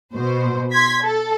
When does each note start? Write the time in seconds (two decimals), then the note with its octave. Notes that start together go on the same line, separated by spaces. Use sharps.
0.15 B2 C5
0.72 C6 G#6 B6
1.04 A4